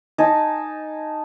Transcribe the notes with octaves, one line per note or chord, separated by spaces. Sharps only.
D#4 G#5 A5